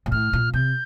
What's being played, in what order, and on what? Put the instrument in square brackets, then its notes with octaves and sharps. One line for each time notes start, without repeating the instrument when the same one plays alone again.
[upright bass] A#2
[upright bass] A2 [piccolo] F6
[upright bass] A#2
[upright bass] C3 [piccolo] G6